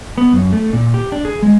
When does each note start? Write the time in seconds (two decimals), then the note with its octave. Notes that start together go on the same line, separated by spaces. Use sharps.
0.18 B3
0.33 F#2
0.53 A3
0.73 A#2
0.94 G4
1.12 D4
1.25 G#4
1.43 G#3